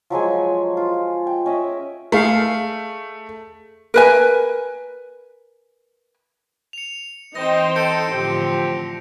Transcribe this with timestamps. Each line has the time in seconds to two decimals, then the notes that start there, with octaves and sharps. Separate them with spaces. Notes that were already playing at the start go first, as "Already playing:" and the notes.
0.10 F3 F#3 G#3 G#5
0.77 F4
1.27 G5
1.46 C#4 D#5 E5
2.12 A3 G#4 F5
3.94 A#4 B4 G#5
6.73 C#7 F7
7.35 E3 C4 D#4 C5 D#5 G5 A#6
7.76 A4 G6 C#7 D7
8.11 A2 D3 F3 C4 G4